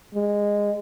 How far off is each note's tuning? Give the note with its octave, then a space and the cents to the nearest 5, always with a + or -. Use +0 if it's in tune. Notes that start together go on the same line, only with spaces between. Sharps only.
G#3 -15